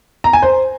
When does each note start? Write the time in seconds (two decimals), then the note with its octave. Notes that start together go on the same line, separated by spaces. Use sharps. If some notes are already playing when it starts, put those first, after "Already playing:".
0.24 A#5
0.33 G#5
0.42 C5